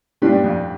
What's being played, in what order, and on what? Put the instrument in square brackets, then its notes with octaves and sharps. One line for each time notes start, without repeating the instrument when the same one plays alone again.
[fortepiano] G2 [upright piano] A#2 G3 D4 G4
[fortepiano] G2
F2